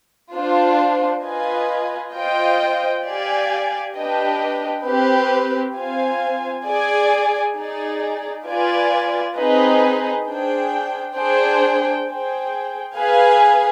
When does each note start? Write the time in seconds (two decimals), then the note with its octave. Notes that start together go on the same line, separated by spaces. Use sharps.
0.35 D4 F4 C5
1.25 F4 B4 D#5 G#5
2.15 F4 C5 D#5 G5
3.05 G4 D5 F5 G#5
3.96 D4 G4 B4 D#5 G5
4.86 C4 G4 B4
5.76 C4 F4 C5 F5 G#5
6.66 G#4 D5 G#5
7.56 D#4 G#4 D5
8.46 F4 B4 D5 G#5
9.37 C4 D#4 G#4 B4 D#5
10.27 D4 G#4 C5 G5
11.16 D4 G#4 C5 G5
12.07 G#4 C5 G5
12.97 G#4 B4 F5 G#5